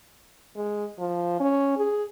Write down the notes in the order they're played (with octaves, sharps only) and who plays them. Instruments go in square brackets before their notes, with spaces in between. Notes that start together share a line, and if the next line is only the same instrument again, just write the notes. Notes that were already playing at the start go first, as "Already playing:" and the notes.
[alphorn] G#3
F3
C#4
G#4